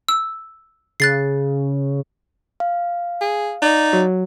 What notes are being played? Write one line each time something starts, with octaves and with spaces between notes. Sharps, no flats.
E6
C#3 F#6 A6 C7
F5
G#4
D#4 D5
F#3